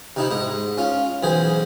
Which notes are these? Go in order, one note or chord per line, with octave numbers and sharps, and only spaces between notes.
C3 D#4 E4
G#2 D#5
C#4 F4
B1 E3 G#4 C5